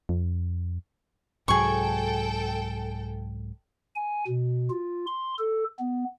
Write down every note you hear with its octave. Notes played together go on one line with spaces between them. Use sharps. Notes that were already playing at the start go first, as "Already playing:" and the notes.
F2
C2 G#2 F#3 G#4 A4 G5 C#6
G#5
B2
F4
C6
A4
B3